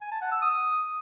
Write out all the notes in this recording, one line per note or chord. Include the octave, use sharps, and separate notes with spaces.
G#5
A5
F#5
E6
D#6